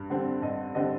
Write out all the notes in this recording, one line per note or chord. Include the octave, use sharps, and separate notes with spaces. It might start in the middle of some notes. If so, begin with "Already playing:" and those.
Already playing: G2
D3 G3 C4
G2 D#5
D3 G3 C4 D#5